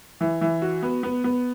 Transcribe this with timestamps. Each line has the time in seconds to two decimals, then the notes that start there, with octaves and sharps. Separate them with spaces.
0.21 E3
0.41 E3
0.62 F#4
0.82 B3
1.03 B3
1.24 B3